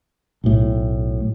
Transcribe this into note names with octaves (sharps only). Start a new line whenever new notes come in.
B1 A2